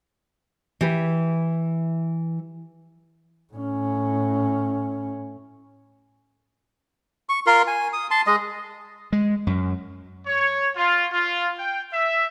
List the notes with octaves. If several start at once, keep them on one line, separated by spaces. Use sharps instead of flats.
E3 G4 B4
A2 C#4
C#6
F4 A#4 C6
G#5
D#6
A5 C6
G#3 D#5
G#3
F#2
C#5
F4
F4
G5
E5